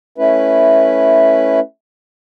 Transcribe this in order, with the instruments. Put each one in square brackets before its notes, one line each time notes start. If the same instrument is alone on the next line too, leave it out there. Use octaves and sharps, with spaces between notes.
[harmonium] A3 C#4 E4 B4